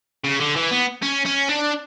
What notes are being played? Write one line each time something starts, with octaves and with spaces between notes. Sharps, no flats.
C#3
D3
E3
B3
C#4
C#4
D4